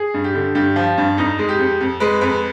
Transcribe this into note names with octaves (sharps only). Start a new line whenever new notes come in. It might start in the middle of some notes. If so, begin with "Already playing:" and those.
Already playing: G#4
G2
G4
D3
G2 G4
F3
G2
F2 D#4
G#3
G4
F2
F2
G#3 B4
F2 B4